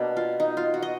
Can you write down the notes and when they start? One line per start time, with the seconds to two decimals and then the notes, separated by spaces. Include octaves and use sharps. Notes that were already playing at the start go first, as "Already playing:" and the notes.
Already playing: B2 A#3 D4
0.17 F4
0.40 D#4
0.57 F4
0.74 F#4
0.82 D#5